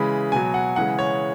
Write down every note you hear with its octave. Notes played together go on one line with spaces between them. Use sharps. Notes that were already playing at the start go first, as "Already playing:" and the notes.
Already playing: C#3 E3 G#3 B5
B2 F#3 G#5
F#5
C#3 E3 G#3 F#5
C#5